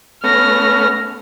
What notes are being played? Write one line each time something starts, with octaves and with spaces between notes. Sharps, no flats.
A3 B3 C#4 F6 A#6